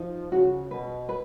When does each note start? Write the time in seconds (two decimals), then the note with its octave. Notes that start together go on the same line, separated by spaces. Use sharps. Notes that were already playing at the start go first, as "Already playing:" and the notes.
Already playing: F3 D#4
0.32 C#3 F#4
0.70 B2 B4
1.09 B4